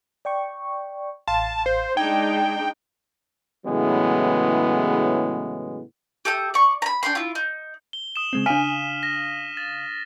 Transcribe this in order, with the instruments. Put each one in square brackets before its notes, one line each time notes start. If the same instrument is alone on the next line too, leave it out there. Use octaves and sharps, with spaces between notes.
[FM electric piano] D5 G5 C#6
[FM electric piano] A1 F5 C6 [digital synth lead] A5
[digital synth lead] C5
[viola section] G#3 D4 D#4 [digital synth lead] G5 [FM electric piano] G#6
[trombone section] A2 C#3 E3 F#3 G#3 B3
[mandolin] G4 A4 E5 D#6
D5 C#6
A#5 B5
D4 G5 B5 C6
E4 F4
D#4
[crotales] G7
D#6 E7
[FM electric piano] C#3 G#3 C4
[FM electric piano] C#3 F5 [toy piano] D4 G#5 [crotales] F6 B6 D#7
[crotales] A#6
A6